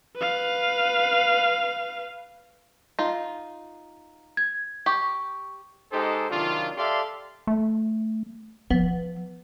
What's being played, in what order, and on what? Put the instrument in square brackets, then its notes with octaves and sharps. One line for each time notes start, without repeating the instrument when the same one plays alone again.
[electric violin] B4 F5
[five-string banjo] D#4 F4
[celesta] G#6
[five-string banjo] G4 [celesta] C#6
[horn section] G#3 D#4 G4 A4 C5
C3 D#3 F#3 D4 F4
G4 A4 D5 E5 F5 C6
[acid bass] A3
[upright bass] F3 [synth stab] B3